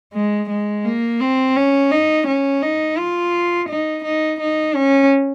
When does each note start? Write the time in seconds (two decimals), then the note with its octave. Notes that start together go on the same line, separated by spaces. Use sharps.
0.14 G#3
0.50 G#3
0.85 A#3
1.20 C4
1.56 C#4
1.91 D#4
2.27 C#4
2.62 D#4
2.98 F4
3.69 D#4
4.04 D#4
4.40 D#4
4.75 C#4